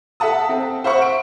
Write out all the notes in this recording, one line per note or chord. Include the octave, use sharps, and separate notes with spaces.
A4 E5 F#5 A5 D#6
C4
C5 E5 F#5 C#6
D7